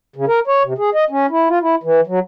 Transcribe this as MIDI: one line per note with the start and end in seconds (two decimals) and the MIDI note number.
0.16 0.25 49
0.28 0.40 70
0.47 0.63 73
0.63 0.73 48
0.78 0.90 68
0.94 1.04 75
1.10 1.26 61
1.30 1.48 64
1.49 1.59 65
1.62 1.75 64
1.83 2.01 52
2.07 2.19 54